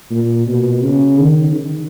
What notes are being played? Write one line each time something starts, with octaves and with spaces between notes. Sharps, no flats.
A#2
B2
C#3
D#3
D#3